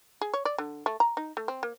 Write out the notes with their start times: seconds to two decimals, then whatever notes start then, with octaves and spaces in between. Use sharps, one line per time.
0.21 G#4
0.34 C#5
0.45 D5
0.58 D3
0.86 A3
1.00 A#5
1.17 D#4
1.37 A3
1.48 C4
1.63 A#3